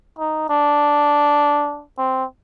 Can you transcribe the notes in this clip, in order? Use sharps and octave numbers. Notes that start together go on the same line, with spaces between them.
D#4
D4
C4